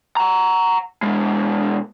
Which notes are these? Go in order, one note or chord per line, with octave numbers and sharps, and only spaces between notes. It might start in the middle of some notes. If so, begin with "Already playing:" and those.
F#5 A#5
B2 G#3